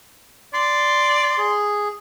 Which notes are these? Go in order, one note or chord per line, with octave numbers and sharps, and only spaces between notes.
D5 C6
G#4